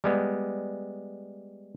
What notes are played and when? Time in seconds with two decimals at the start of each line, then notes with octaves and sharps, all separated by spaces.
0.04 G3 G#3 B3